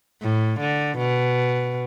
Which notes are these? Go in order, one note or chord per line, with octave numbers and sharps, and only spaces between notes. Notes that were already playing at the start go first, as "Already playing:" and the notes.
A2
D3
B2